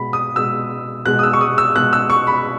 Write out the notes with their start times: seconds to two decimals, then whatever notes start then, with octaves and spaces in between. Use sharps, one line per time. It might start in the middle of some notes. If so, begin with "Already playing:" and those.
Already playing: B2 G#3 B5
0.13 D#6
0.36 B2 G#3 E6
1.05 B2 G#3 F#6
1.19 D#6
1.23 E6
1.33 C#6
1.41 D#6
1.58 E6
1.75 B2 G#3 F#6
1.93 E6
2.10 C#6
2.27 B5